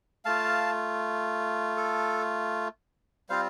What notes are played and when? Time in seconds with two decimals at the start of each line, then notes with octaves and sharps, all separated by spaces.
0.25 A3 F4 F5 A5
1.77 A4
3.29 G3 C4 F4 C5 F5